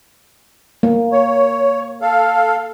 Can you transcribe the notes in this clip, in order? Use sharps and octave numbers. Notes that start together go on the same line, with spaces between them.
A#3
C#5
A4 F5